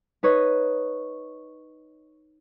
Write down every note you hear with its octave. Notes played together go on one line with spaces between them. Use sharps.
D#4 B4 C#5 D#5